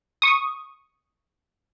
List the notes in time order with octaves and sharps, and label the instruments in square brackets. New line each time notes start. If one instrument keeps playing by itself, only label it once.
[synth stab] C#6 D#6